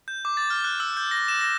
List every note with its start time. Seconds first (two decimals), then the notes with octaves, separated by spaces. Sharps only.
0.08 G6
0.25 D6
0.37 A6
0.50 F6
0.65 F#6
0.80 E6
0.97 G6
1.11 A#6
1.28 E7
1.41 A#6